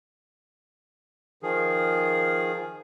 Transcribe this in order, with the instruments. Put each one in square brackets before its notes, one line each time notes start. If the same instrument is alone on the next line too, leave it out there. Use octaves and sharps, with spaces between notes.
[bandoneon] D#3 F3 G#4